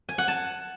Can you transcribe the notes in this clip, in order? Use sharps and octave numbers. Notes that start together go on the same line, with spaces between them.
G#5
F#5
A5